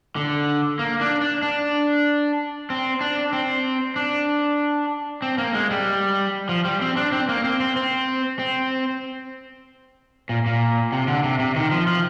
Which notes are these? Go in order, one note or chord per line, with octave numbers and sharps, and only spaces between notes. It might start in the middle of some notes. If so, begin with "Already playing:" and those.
D3
A#3
D4
D4
D4
C4
D4
C4
D4
C4
A#3
G#3
G3
F3
G3
C4
D4
C4
A#3
C4
C4
C4
C4
A#2
A#2
C3
D3
C3
C3
D#3
F3
F3